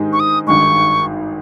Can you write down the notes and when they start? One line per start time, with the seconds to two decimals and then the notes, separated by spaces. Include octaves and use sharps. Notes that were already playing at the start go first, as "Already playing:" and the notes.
Already playing: G#2 D#3 G#3 D#4 G4
0.13 C#6
0.20 D#6
0.47 G#1 G2 D#3 G#3 C#6